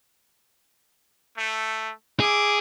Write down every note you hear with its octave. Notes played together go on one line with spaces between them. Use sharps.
A3
E4 G#4 D6